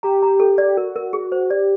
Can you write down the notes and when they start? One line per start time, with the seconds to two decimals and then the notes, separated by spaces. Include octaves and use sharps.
0.03 G4 A#5
0.23 A#5
0.40 A4
0.58 D5
0.77 F#4 A#4
0.96 A#4
1.13 G#4
1.32 C5
1.50 G4 D5